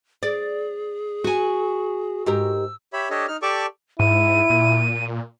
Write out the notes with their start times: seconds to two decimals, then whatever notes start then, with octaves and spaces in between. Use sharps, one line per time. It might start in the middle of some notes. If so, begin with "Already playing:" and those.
0.23 G#4 D5
1.24 F#4 G#5
2.26 G#2 G4 A#4 E6
2.93 G4 C#5 E5 B5
3.10 D4 G4 A4 C#5 D#5
3.28 D#4 F6
3.42 G4 A4 D5 A5 C#6 D6
3.99 G#2 E4 D#7
4.50 A#2